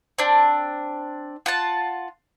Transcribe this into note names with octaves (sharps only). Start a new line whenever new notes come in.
C4 D4
F4 F#5 A5